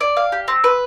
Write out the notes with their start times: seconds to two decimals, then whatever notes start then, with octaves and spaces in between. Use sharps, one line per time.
0.01 D5
0.17 F5
0.32 G4
0.48 C4
0.64 B4